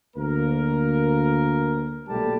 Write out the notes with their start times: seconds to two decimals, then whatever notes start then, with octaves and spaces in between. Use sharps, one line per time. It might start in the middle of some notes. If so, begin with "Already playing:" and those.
0.17 D2 A#3 A#4
2.08 B1 A#2 G3 A3 G4 A5